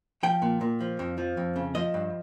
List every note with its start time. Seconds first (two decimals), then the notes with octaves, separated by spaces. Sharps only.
0.23 F3 G5
0.42 A#2
0.61 A#2
0.81 F3
0.99 F2
1.18 F3
1.37 F2
1.56 C#3
1.75 F3 D#5
1.94 G2